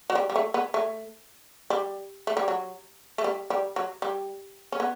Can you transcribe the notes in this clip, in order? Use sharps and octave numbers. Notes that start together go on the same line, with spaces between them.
F#3
G3
G3
A3
B3
A3
G3
A3
G3
F#3
A3
G3
G3
F#3
G3
C#4
B3